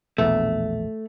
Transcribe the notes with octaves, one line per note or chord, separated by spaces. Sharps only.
A#1 E2 B2 A3